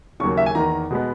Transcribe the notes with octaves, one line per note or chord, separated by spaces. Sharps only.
D#2 C#3 F#3 A#3 C#6
E5
G#5
E2 D#3 A#3 A#5
B2 G#3 B3